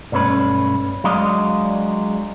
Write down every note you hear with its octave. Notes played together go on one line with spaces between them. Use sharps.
B1 G2 A3 C#4 B4
F#3 G#3 D4 D5 D#5 F5